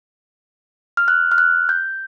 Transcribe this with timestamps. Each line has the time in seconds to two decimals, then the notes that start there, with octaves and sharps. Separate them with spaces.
0.97 F6
1.08 F#6
1.32 F6
1.38 F#6
1.69 G6